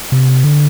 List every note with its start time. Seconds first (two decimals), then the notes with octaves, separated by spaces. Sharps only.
0.12 C3
0.44 D3